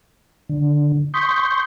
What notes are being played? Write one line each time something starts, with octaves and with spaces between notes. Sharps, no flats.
D3
C6 C#6 D#6 G6 B6